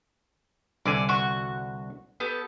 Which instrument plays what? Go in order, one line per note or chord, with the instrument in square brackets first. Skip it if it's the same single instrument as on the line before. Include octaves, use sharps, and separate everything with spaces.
[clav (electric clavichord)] C2 D3 G#5 [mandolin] D5
[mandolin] F#4 C#6
B3 G4 A4